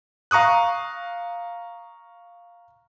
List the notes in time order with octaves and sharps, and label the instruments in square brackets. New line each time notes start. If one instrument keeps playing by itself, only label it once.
[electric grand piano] F5 A#5 C#6 D#6 F#6